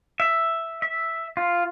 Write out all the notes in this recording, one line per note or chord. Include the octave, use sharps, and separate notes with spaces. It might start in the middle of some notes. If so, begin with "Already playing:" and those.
E5
E5
F4